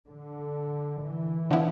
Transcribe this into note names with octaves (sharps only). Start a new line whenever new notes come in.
D3
E3
D3 F3 B3 E4